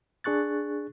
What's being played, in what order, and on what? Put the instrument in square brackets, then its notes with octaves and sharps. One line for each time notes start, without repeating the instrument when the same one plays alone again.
[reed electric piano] D4 G#4 C#6 F#6 A6